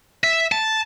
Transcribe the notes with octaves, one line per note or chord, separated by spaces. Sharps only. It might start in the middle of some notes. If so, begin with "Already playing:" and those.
E5
A5